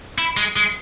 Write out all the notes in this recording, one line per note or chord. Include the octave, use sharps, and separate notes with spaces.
E4
G#3
G#3